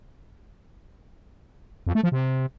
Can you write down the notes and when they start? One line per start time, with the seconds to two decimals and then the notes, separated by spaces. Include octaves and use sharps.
1.87 F2
1.95 A3
2.03 F3
2.12 C3